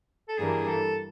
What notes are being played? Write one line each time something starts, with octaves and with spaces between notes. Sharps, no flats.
A4
G2 E3 G3 A#3 D4 G#4
A4